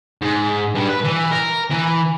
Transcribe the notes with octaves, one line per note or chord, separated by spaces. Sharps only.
G#2
G2
B4
E3
A#4
E3